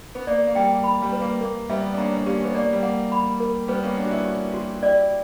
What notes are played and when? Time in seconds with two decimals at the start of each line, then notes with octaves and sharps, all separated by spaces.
0.15 B3
0.27 A#3 D5
0.47 A#3
0.55 G3 G5
0.84 B5
1.02 G3
1.13 B4
1.21 A#3
1.41 A#3 A#4
1.69 G3 B3 E5
1.94 D4
1.98 A#3 C#4 A#5
2.17 D4
2.26 A#3 C#4 G4
2.44 B3
2.54 A#3 D5
2.73 G3
2.83 A#3 F#5
3.12 B5
3.40 A#4
3.68 G3 B3 B4
3.83 A#3 C#4
3.97 B3 D4 F#5
4.05 F#4
4.11 C#4 E4
4.25 C#6
4.54 F#4
4.82 E4 G4 D5